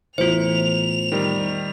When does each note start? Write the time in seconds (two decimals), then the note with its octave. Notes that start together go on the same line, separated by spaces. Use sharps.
0.18 E2 A2 E3 F4 C5 F7
1.12 D#3 G3